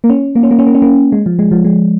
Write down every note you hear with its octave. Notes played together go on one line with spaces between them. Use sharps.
A#3
C#4
A#3
C#4
A#3
C#4
A#3
C#4
A#3
G#3
F3
G#3
F3
G#3